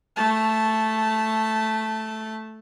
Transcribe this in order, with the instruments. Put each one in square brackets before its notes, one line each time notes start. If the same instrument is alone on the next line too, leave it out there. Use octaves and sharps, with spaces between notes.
[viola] A3 A5